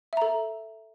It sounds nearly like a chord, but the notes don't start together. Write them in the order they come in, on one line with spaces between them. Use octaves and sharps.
E5 A#5 A4